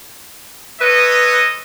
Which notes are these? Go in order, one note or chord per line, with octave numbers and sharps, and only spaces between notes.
A4 B4 C#5 D#5